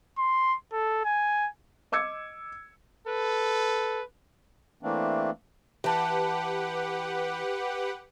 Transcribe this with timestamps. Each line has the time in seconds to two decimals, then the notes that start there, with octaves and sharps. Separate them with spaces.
0.19 C6
0.73 A4
1.05 G#5
1.92 D#5 D6 E6 G#6 C#7
3.07 A4 B4
4.83 E3 A3 A#3 C4 D4
5.84 E3 G4 B4 F#5 A5